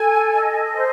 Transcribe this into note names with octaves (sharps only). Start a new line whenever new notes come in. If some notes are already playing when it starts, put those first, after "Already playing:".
Already playing: A4 G#5
D#5
C5